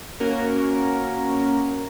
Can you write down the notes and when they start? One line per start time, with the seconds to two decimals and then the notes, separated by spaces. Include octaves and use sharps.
0.20 A#3 C#4 F#4 A#4